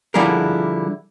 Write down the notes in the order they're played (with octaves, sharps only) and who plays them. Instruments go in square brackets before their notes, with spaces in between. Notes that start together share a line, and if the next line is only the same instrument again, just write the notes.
[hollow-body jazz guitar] D3 F3 G3 E4 G#4 A#4